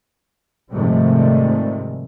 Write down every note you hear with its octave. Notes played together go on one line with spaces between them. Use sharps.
G#2 C3 D#3 F3 G3 A3